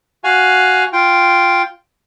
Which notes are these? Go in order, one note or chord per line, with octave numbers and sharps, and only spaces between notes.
F#4 F5 G#5
F4 G5